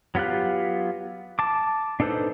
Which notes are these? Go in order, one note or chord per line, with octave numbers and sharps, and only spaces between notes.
F#3 B3 F4 G4 F#6
A5 D6
D4 D#4 A4 B4 C5